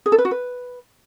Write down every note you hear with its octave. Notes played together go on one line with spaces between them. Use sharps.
G#4
A4
B4
F#4
B4